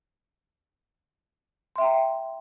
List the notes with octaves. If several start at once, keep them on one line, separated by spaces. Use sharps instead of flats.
E5 G5 A#5 C6